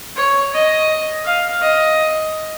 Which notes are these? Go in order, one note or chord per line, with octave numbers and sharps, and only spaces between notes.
C#5
D#5
F5
D#5